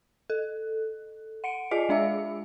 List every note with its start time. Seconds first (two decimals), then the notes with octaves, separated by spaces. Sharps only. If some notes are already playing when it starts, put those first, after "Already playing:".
0.30 A4
1.44 F#5 C#7 D7
1.71 F4 G#4 D5 D#5 G#5 D7
1.89 G#3 D4 E5 E6